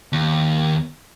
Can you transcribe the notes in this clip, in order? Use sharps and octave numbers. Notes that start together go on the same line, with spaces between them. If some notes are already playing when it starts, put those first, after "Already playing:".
D#2